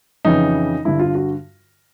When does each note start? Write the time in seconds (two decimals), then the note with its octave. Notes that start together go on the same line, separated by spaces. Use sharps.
0.25 F2 C#3 E3 D#4
0.85 G2 D3 E4
0.99 F4
1.15 F#4